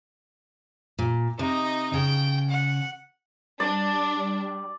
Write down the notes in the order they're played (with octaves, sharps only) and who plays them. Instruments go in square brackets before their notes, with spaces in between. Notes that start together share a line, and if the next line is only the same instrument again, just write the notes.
[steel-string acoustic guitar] A#2
[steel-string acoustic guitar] C3 [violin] D#4 D#5
[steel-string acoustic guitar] C#3 [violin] G5
[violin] F#5
[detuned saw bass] G3 [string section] D4 [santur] D5